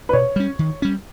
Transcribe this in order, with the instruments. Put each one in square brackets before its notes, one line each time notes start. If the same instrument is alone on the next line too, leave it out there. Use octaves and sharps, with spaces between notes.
[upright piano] B4
[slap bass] B2 [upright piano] C#5
[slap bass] G3 C#4
D#3
G3 C#4